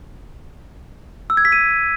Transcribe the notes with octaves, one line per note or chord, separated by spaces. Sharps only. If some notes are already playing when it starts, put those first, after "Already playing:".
E6
G#6
B6
D#7